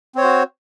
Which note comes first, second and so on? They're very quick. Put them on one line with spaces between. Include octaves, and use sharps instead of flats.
C4 C#5 C5 F#4